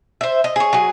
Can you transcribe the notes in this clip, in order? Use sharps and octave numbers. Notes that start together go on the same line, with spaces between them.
C5 E5
D#5
G#4 C#5
F#3 G#4